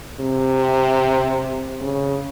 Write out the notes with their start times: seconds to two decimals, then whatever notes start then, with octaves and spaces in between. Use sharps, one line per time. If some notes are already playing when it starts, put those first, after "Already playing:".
0.20 C3
1.81 C#3